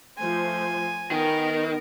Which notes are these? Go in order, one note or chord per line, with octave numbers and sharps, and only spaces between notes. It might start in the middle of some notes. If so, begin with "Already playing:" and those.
F3 A3 C5 G#5
D#3 B3 A#4